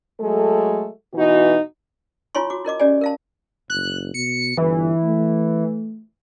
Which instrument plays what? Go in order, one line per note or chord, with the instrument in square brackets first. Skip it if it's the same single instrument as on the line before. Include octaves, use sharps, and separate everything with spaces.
[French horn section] F#3 G#3 A3 A4
B2 E3 D#4 F#4
[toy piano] E4 F4 C#5 G#5 C6 C#6
F#4 D6
E4 A#4 D#5 D6
C#4 G4 D5 G#5
A#4 F5 A5
[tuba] F#1 [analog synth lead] F#6
[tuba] B2 [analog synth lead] C#7
[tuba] G1 [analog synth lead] E3
[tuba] A3